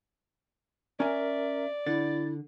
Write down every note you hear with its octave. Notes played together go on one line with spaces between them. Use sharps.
C#4 A#4 D5 E5 G#5
D3 E4 A6